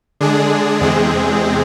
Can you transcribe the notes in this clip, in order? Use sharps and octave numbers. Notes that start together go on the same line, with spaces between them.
D3 G#3 D4 G#4
E2 C3 G#3 C4 G#4